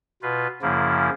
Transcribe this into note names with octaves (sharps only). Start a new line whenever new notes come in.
B2 F4 B4
F#2 C#3 F3 A#3 E4